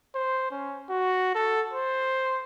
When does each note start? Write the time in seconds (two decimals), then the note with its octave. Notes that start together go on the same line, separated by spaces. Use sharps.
0.15 C5
0.51 C#4
0.90 F#4
1.35 A4
1.73 C5